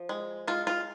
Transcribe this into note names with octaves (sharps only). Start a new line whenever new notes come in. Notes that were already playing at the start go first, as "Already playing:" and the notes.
Already playing: F3
G#3
G#3 F4
F4